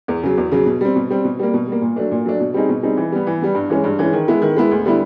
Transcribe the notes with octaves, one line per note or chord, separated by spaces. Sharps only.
E2
C#3 F#3
E2
C#3 F#3
B2
G3 C4
B2
G3 C4
B2
G3 A#3
B2
G3 A#3
A#2
F#3 A3 D4
A#2
F#3 A3 D4
B2
G3 C4 D#4 G#4
B2
G3 C4 D#4 G#4
E3
G3 B3
E3
G3 B3
G2
E3 G#3 C#4
G2
E3 G#3 C#4
D#3
G#3 B3 E4
D#3
G#3 B3 E4
D2
D3 G3 B3 E4